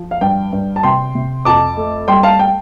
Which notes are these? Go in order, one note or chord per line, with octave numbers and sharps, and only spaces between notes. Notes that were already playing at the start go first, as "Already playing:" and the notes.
Already playing: F3
F5
G2 G5
G2
A5
C3 G5 C6
C3
F2 A5 D6
A3
G3 G5 C6
F5 A5
G5